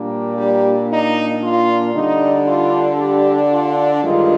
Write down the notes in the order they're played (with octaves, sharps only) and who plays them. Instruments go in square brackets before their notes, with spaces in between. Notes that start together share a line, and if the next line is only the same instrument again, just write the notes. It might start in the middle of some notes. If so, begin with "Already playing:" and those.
Already playing: [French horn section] A#2 G3 A#3 D4
G3 G4
D#4
F4
D3 G3 D4 D#4
F4
G3 G4
F4
G2 D#3 G#3 F4